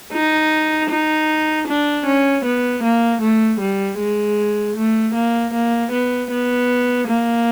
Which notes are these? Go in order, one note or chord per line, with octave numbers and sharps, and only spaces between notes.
D#4
D#4
D4
C#4
B3
A#3
A3
G3
G#3
A3
A#3
A#3
B3
B3
A#3